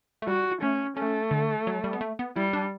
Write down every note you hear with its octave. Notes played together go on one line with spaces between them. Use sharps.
A3
G3 F#4
A3 C#4
A3 C#4
D3
F#3
G3
B3
A3
B3
G3 E4
D4